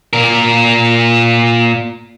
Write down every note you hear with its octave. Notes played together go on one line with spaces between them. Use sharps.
A#2 A#4